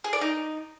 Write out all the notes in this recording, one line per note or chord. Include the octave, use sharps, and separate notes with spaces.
G#4
D5
D#4